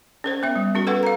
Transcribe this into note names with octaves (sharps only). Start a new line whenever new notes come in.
C#4 A#4 C5
B3 E5
G3
C#4 F#4 A#4
A4 B4 F#5
F5 A#5